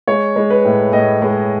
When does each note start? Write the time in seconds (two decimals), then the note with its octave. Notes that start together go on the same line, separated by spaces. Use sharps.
0.08 G#3 C#5
0.36 G#3
0.50 B4
0.65 A2
0.92 A2 D#5
1.22 G#3